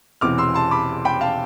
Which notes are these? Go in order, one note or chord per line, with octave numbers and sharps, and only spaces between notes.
E1 E2 C3 E3 D6 F6
C6 E6
A5 C6
B5 D6
G5 B5
F5 A5